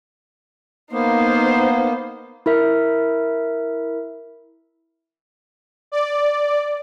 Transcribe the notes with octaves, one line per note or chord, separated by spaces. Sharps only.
A#3 B3 D#4 C5
E4 A#4 E5
D5